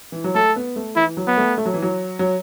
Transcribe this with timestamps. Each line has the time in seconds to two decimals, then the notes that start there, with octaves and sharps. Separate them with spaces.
0.12 E3
0.24 F#3
0.35 A3 A4
0.56 B3
0.76 A3
0.96 E3 E4
1.17 F#3
1.27 B3
1.37 A3
1.57 A3
1.65 F#3
1.74 E3
1.82 F#3
2.19 F#3